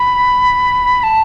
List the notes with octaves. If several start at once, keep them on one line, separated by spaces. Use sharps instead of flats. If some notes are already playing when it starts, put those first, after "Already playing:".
Already playing: B5
A5